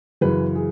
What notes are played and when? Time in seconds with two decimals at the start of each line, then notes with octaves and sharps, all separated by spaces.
0.21 F#2 C#3 E3 B4
0.56 G#4